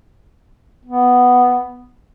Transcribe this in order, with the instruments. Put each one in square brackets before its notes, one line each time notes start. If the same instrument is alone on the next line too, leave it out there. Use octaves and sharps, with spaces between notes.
[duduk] B3